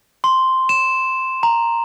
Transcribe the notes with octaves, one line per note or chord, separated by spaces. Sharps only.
C6
E7
A#5